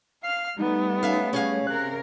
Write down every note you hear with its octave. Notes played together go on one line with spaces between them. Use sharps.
F5 F6 C7
G3 A3 B3 D#4
C#4 E5 F5
C#4 G#4 C#5 F5
C3 A#4 F#6